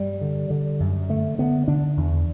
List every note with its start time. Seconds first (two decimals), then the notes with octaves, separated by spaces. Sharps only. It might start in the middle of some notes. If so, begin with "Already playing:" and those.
Already playing: G2 G3
0.21 D3
0.50 D3
0.80 F#2
1.09 D3 A3
1.38 D3 B3
1.68 D3 D4
1.97 E2